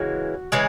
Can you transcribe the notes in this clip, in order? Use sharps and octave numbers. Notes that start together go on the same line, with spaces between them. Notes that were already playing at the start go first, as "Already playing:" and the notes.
Already playing: C#3 E3 G#3 F#4
C#3 E3 G#3 G#4